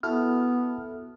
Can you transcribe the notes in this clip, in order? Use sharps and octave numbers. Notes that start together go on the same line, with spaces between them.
B3 E4 F#4 A4 F6